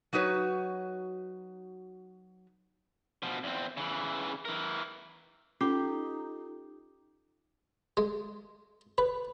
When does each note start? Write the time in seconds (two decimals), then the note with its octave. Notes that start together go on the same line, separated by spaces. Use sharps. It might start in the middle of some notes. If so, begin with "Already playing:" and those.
0.13 F#3 D#4 F#4 B4 C#5
3.23 B2 F3
3.44 E2 C4
3.77 C#3 E3
4.45 E3 A#4
5.61 C#4 D#4 F4 G4 A4
7.97 G#3
8.98 B4